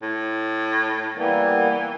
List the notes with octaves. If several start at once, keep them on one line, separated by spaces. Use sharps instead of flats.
A2
E3 G3 A#3 B3